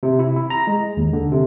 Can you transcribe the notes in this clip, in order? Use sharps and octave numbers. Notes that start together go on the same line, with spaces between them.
C3
E4
E4
A#5
G#3
D#2
D3
C3